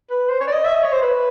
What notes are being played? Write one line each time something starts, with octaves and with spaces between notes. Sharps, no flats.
B4
C5
C#5
D5
D#5
E5
D#5
C#5
C5
B4